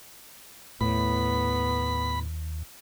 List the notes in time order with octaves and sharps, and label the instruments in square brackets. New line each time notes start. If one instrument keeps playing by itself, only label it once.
[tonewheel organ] D#2 [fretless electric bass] A2 [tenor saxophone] B3 [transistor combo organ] B5